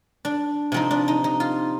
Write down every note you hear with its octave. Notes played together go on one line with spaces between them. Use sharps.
D4
C3 F3 C4 D#4
D4
D#4
D#4
F4